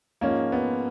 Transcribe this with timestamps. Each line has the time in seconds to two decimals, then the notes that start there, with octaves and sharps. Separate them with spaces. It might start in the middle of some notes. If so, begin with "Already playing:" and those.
0.21 G#2 F3 G#3 A#3 C#4
0.52 B3